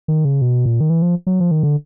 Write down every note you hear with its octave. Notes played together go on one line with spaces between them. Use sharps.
D#3
C#3
B2
A#2
D#3
E3
F3
F#3
F3
D#3
D3